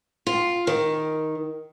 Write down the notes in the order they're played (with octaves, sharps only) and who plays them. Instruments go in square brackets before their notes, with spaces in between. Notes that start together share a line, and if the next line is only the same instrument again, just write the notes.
[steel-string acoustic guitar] F4
D#3